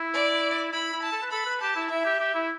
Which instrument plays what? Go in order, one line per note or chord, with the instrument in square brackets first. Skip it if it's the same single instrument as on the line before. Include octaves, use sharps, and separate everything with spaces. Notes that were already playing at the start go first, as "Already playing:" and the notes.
Already playing: [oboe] E4
[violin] D5
[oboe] E4 [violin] B5
[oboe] E4
[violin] A5
[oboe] A4
B4
[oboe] A4 [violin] B5
[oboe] B4
[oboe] G4 [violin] A5
[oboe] E4
[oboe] E4 [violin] E5
[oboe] G4
G4
E4